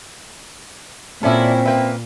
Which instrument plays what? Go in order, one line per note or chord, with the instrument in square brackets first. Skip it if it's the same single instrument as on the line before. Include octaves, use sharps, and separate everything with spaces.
[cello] A#2 [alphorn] C4 [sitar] C#4 E4 [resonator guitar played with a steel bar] A4 D5 E5
[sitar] A#3 B4 [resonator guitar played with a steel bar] E5 G5